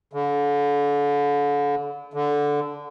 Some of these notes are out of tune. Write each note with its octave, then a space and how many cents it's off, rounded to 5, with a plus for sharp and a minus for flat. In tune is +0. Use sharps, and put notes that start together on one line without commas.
D3 -35
D3 -10